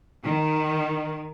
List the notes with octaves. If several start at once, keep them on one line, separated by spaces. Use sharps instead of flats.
D#3